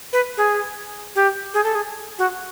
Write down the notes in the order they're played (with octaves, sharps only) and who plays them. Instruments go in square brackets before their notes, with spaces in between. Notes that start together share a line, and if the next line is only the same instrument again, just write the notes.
[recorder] B4
G#4
G4
G#4
A4
G#4
F#4